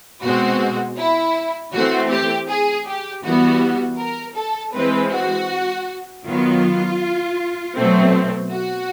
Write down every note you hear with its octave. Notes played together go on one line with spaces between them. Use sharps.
B2 G#3 C4 F#4
E4
E3 A3 C4 F#4
G4
G#4
G4
E3 G3 B3 F#4
A#4
A4
E3 G#3 C4 B4
F#4
D#3 F#3 B3 F4
B2 F#3 A3 C4
F#4